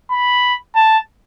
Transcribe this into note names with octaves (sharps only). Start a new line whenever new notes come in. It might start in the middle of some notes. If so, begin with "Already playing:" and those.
B5
A5